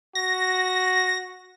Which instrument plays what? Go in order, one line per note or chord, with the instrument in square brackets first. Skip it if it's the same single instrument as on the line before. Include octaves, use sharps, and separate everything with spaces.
[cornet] F#4 [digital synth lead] A#6